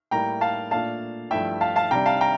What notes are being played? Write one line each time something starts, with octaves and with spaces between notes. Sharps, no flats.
A2 G3 A#3 E4 G5 A#5
F5 A5
A#2 A3 D4 F5 A5
G2 F3 A3 E4 E5 G5
F5 A5
F5 A5
C3 G3 D4 G5 A#5
F5 A5
G5 A#5